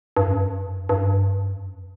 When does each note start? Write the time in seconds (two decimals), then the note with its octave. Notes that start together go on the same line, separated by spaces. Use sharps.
0.17 G2
0.27 F#2
0.89 G2
1.51 F#2